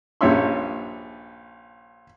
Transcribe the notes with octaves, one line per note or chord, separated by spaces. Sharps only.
A#1 G2 C#4 E5 C6